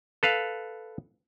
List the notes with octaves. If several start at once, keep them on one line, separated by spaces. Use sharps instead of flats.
A4 B4 F5